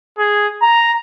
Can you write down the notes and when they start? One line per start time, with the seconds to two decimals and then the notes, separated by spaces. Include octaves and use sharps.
0.19 G#4
0.63 A#5